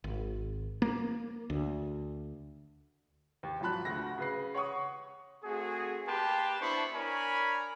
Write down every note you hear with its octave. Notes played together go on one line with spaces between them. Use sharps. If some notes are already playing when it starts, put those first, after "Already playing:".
G#1
A#3
D2
D#2
G#1 F3 F#3 A5 B5 F#6
D2 F#4 A#6
C#3 B4 C7
C#5 F#5 C#6 D#6
A3 C4 F#4 G#4
A#3 G4 B4 G5 A5 C6
B3 D4 E4 C5 B5 C#6
D4 A#4 C#5 G#5 B5